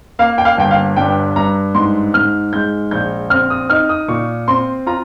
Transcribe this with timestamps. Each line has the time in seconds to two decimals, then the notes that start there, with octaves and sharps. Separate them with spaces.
0.19 A#3 F5
0.38 G5
0.45 F5
0.57 G1 G5
0.71 F5
0.96 G2 G5
1.36 G2 A#5
1.75 G#2 C6
2.14 G#2 F6
2.53 G#3 G6
2.91 A#1 G6
3.30 C4 F6
3.50 D#6
3.70 D#4 F6
3.89 D#6
4.08 A#2 C#6
4.48 C4 C6
4.87 F4 A#5